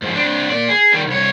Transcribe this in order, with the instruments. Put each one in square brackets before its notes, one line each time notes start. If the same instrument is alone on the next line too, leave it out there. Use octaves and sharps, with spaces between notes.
[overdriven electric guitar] G#2 F3
C4 D4
A#2 D5
G#4
D#3 G3
C2 C#5